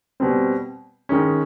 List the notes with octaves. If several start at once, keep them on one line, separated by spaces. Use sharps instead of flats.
B2 G3 C4
D#3 G#3 C#4